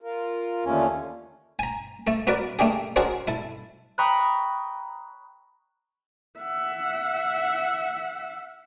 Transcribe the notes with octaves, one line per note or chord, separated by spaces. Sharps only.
F4 A#4
D#2 D3 A3 C#4 F4
G#5 A#5
A3 A4
B3 F#4 A#4 B4 D5
A3 A#3 D4 G4 G#4
D4 F#4 G#4 A#4 C5 C#5
E4 A4
G5 A#5 B5 C#6 D#6 F#6
E5 F#5